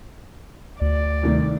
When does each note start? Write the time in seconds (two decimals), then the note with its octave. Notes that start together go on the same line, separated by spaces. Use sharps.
0.81 D2 D5
1.23 C2 D#3 A3